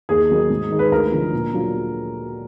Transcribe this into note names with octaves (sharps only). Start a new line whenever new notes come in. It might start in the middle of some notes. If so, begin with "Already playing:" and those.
D#2 G#4
D#3 F#3 A#3 D#4
G#2
D#3 G#3 D#4
B4
D2 A#4
D3 F3
A#2
F#3 D4 F4